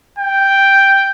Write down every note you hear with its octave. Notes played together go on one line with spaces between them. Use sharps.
G5